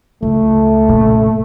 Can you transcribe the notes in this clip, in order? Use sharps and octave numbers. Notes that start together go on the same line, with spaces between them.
C#2 A3
A#2 C#3